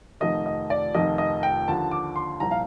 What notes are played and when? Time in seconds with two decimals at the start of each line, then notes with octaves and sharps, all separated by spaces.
0.20 F1 F2 D#3 D#5
0.46 D#5
0.70 D5
0.95 F1 F2 D#3 D#5
1.18 D#5
1.43 G5
1.68 D#2 D3 F3 A5
1.91 D6
2.16 C6
2.40 C2 A#2 F3 A#5
2.51 F5